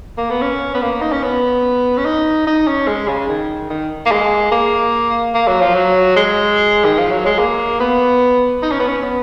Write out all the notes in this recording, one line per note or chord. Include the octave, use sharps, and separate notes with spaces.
A#3
B3
C#4
B3
A#3
D#4
C#4
B3
C#4
D#4
D#4
C#4
G#3
C#3
D#3
D#3
A#3
G#3
A#3
A#3
F#3
F3
F#3
G#3
D#3
F3
F#3
G#3
A#3
B3
D#4
C#4
B3
C#4
B3